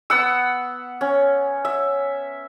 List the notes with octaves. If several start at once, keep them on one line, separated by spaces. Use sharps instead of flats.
B3 F#5 E6
C#4
E5